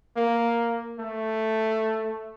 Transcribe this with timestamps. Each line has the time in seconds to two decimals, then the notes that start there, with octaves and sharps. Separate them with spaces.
0.16 A#3
0.99 A3